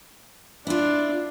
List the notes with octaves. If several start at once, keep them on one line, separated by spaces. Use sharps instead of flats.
D4 E4 F4